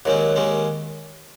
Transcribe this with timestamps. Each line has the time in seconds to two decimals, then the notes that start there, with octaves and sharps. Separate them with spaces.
0.05 D#2 D#3 F#3 G#3 C#4
0.36 D#2 D#3 G#3 C#4